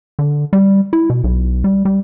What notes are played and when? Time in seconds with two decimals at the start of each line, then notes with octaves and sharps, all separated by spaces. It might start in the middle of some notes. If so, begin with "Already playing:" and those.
0.19 D3
0.53 G3
0.93 E4
1.10 B2
1.24 B1
1.64 G3
1.85 G3